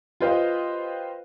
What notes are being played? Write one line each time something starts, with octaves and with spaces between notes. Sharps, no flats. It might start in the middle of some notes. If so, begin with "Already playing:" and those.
F4 G4 B4 C5 D#5 F5